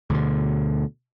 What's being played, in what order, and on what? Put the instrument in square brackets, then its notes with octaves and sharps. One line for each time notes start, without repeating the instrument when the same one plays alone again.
[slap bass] D2 B2 D3